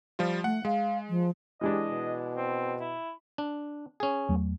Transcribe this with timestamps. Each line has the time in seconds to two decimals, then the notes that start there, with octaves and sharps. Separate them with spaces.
0.19 F3 G3 F4
0.44 A3 F#5
0.65 G#3 F5
1.09 F3
1.61 E3 G#3 D4 G4 D#5
1.90 B2
2.37 C4
2.80 E4
3.38 D4
4.00 C#4 G#4
4.29 E2 F#3 A3